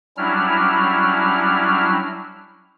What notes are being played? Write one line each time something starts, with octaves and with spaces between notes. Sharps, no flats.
F#3 G3 C#4 D4 E4 F6